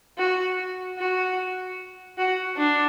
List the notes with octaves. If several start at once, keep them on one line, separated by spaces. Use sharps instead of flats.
F#4
F#4
F#4
D4